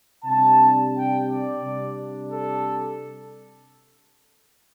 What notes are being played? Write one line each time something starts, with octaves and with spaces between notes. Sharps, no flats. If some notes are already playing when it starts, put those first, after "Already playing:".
C3 G3 D4 A5
G5
D5
C3 G3 D4
A4